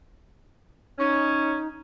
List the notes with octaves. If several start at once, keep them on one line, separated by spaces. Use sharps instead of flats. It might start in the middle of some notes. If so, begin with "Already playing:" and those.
C#4 D#4